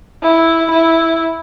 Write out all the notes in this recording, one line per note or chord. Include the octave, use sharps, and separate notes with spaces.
E4
E4